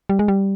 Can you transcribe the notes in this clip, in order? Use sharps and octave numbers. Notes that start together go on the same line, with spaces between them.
G3
G#3
G3